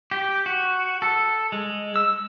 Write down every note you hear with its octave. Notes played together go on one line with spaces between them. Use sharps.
G4
F#4
A4
G#3
E6